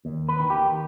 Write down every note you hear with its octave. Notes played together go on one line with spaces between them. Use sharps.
D#2
B4
D#3
G4